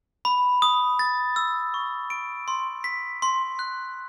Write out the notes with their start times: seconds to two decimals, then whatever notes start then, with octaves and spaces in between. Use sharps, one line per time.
0.25 B5
0.62 D#6
0.99 A6
1.36 E6
1.74 C#6
2.10 D7
2.48 C6
2.84 B6
3.22 C6
3.59 F#6